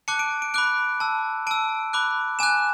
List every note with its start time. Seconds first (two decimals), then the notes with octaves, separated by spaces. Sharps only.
0.08 A5 D6 F#6 C#7
0.19 D7
0.42 D7
0.54 B5 D6 F#6 D7
1.00 A5 E6
1.47 A5 E6 D7
1.93 B5 D6 F#6
2.39 G#5 D6 F#6 E7